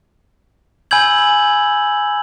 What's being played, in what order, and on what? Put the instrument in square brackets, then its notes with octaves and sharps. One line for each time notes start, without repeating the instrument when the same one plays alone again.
[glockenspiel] G#5 B5 E6 G6 G#6 F#7